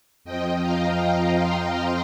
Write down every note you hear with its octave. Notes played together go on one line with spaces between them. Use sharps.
F2 F3 D#5 G5
F5 A#5
G5 C6